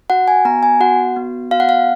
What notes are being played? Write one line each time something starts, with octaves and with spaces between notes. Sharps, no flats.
F#4 F#5
G#5
B3 A#5
G#5
F#4 F#5
B3
F#4 F5
F#5
F5